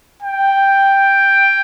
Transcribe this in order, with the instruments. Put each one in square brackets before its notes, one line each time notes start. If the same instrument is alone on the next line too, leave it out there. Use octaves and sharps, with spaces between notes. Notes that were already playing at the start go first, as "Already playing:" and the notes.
[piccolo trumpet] G5